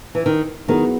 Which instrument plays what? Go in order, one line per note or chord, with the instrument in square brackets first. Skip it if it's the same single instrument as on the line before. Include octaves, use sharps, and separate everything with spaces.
[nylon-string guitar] E3
D#3
[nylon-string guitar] D#3 [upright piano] F#3 B3 E4 G#4